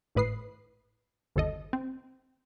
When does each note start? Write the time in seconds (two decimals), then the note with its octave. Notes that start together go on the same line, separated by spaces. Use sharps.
0.15 G#1 A2 B4 D#6 C7
1.36 G1 D#2 A4 D#5
1.73 C4